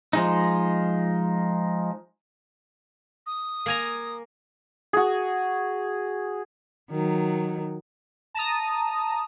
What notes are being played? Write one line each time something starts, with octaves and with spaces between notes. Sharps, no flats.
F3 G#3 D#4
D#6
A#3 G#5 A#5
F#4 G#4
D#3 F#3
A5 A#5 D#6